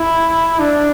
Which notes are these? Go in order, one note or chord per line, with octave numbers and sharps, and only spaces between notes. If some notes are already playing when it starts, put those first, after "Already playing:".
Already playing: E4
D4